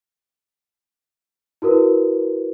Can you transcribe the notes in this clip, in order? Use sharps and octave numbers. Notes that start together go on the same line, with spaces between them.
E4 F#4 A#4 B4